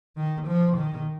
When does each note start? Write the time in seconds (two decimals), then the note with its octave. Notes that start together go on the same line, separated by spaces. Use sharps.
0.17 D#3
0.47 F3
0.77 D#3